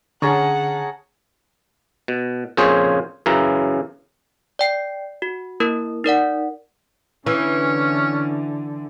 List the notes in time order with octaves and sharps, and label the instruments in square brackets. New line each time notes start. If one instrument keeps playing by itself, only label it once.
[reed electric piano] D3 [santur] C#4 A5 A#5 [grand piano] G#4 C#6 [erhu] F#5
[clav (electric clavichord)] B2
F2 A#2 C#3 G#4 C5 C#5
F#2 C#3 E3 A#5
[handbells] D5 G5 C7
F#4
A#3 E4 A#4
D#4 A#4 D5 F#5
[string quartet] D3 [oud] E3 [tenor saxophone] C#4